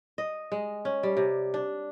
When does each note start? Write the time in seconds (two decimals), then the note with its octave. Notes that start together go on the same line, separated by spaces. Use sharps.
0.18 D#5
0.52 G#3
0.85 C#4
1.03 G3
1.17 C3
1.54 D4